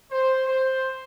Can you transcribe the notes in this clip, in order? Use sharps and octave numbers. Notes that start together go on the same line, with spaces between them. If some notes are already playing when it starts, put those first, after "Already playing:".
C5
C5